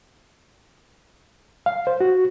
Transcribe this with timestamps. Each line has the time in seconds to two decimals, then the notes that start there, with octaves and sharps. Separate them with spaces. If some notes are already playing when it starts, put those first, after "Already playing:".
1.66 F5
1.87 C5
2.00 F#4